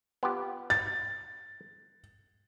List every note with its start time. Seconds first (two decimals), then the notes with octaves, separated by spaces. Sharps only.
0.23 B3 F4 G4
0.70 A6